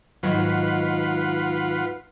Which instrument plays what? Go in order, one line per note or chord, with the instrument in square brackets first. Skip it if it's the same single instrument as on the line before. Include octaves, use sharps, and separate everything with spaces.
[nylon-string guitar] G#2 D#3 F#3 [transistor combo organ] F4 B4 F#5